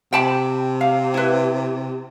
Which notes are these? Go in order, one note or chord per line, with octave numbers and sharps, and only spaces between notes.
C3 G5 A5 B5
F5
E4 B4